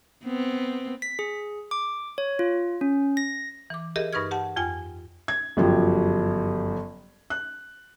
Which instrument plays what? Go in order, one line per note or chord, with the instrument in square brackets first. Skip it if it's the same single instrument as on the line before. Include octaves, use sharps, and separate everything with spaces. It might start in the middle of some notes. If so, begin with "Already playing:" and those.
[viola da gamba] B3 C4
[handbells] B6
G#4
D6
C#5
F4
C#4
A#6
[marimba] E3 D6
G4 G#4 A#4 D#5 E5
G2 D#4 B4 C#6 F6 G#6
G4 F#5 A5
F2 F4 G5 G#5
[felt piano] G#6
G1 F#2 F3 G4
F#6